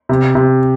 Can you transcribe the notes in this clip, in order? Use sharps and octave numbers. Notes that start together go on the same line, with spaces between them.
C3
C3